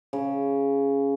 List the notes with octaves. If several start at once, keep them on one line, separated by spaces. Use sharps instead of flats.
C#3